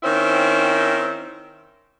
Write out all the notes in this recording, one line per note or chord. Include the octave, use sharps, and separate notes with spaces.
D#3 C4 C#4 E4 C5